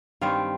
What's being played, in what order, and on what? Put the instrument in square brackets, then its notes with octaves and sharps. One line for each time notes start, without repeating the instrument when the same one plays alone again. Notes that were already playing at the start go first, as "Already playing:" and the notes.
[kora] G2 D#3 G3 C4 F5